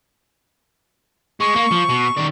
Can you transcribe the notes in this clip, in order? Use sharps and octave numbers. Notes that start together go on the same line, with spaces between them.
G#3 C#6
A#3
F3
B2
D#3 D5